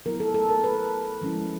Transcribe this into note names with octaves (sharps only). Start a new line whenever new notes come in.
F#3 B3 E4 A#4
A4
A4
A#4
B4
F3 G#3 C#4 E4